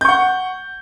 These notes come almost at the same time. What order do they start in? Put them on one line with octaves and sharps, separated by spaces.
G6 C#6 F#5